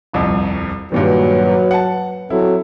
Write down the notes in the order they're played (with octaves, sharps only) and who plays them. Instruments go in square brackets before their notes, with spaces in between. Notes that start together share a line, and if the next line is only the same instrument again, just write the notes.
[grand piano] D#1 C2 F2
[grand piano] G2 A#2 D#3 [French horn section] F#3 B4
[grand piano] F#5 A5
[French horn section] F#3 C4 A4 [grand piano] E4